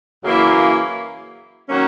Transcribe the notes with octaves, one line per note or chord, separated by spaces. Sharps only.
F#2 C#3 E3 A#3 E4
D#3 F#3 A#3 C#4